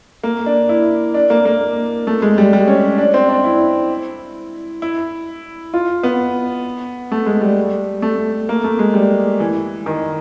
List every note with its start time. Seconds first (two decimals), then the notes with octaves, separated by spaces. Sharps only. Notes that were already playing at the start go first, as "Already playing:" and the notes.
0.24 A#3
0.46 D4
0.69 E4
1.14 D4
1.30 A#3
1.45 A#3
2.07 A3
2.22 G#3
2.38 G3
2.53 G3
2.68 C#4
2.98 D4
3.14 C4
3.29 D4
3.44 E4
4.82 E4
5.74 F4
6.03 B3
7.12 A3
7.26 G#3
7.41 G3
8.02 A3
8.49 A#3
8.64 A3
8.79 G#3
8.94 G3
9.40 E3
9.86 D#3